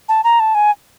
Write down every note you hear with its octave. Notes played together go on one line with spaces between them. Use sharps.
A5
A#5
A5
G#5